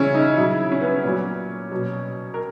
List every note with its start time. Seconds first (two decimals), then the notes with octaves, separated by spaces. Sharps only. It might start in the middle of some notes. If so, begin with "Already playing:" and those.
Already playing: C#3 E3 C#4 E4
0.14 D#4
0.37 C#3 F#3 E4
0.72 C#4
0.81 B3
1.03 A#2 F#3 C#4
1.71 B2 F#3
2.34 A#4